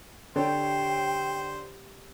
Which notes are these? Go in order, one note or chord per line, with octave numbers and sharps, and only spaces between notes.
D3 G4 A4 C5 C#5 G5